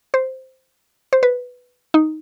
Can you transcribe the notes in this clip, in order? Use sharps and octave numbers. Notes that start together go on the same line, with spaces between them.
C5
C5
B4
D#4